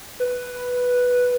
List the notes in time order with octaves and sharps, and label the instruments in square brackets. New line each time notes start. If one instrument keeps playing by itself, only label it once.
[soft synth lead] B4